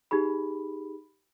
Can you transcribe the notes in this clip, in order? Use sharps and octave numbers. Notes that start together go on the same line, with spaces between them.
D#4 G4 G#4 B5